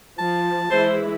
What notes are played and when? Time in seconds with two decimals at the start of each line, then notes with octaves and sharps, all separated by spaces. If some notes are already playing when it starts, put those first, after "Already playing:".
0.18 F3 A5
0.70 E3 G#3 E4 C5